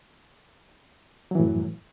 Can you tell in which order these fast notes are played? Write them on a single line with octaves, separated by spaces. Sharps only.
F#3 E3 A2 F#2